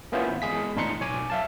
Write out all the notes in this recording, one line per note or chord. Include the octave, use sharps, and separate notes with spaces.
A#3 B3 C#4 E4 F4 C5
G#1
E2 G#3 G#4 B6
G#1 A2 D4 D#4 C6 C#7
B1 C#5 G#5 D6
E5 F5 A5